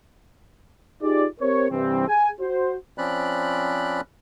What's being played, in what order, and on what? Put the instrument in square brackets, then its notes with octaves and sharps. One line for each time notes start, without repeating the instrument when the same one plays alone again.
[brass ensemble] D#4 F4 G4 G#4 D5
C4 G4 A#4 C5 C#5
G2 C3 E3 C4
G#4 G#5
F#4 C5
[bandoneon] F3 C4 C#4 D5 B5 F#6